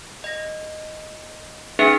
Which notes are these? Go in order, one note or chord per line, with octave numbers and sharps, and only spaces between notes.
D#5 A#6
C#4 D#4 G#4 B4 E5 F#5